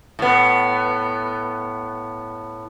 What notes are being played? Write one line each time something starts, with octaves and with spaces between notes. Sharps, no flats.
A2 B3